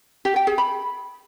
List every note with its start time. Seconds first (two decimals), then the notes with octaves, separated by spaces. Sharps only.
0.25 G4
0.36 G5
0.47 G#4
0.58 B5